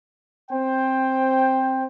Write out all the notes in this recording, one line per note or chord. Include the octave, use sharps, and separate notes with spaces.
C4 C5 G5